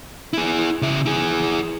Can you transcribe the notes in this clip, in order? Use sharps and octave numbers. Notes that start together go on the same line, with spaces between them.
E4 G#4
C#3 E5
E4 G#4